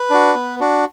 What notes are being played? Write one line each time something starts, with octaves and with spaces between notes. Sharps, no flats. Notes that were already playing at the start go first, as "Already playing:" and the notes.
Already playing: B4
D4 F#4
B3
D4 F#4